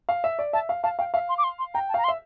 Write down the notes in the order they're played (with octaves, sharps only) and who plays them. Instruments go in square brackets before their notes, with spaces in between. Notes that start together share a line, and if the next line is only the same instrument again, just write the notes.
[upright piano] F5
E5
D5
[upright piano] E5 [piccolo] A5
[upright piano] F5
[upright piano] F5 [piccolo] A5
[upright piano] F5 [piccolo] G5
[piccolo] E5 [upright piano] F5
[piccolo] C6
D6
C6
C6
[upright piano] G5 [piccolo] A#5
[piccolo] A5
[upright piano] F5 [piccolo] A#5
[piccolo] C6
[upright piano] E5